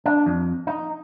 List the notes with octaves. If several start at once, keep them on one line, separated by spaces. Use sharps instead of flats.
D4
F2
D#4